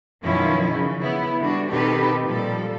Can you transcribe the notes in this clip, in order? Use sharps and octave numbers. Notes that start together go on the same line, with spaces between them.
F#2 B2 D#3 F3 C#4 E4
C#3
B3 E4
D3 G3 D4 F#4
B2 D#3 C4 G4 A4 B4
A#2 F3 G3 A4